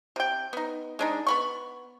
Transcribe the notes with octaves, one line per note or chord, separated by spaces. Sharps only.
C3 G5
B3 D#4
G#3 D4 D#4
B3 B5 C#6